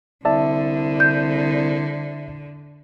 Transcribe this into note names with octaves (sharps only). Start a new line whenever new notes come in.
C2 D3 D5 E5 A5
G6